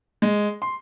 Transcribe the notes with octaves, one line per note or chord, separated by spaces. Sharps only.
G#3
C6